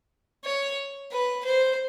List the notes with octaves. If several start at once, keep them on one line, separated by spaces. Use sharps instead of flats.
C#5
B4
C5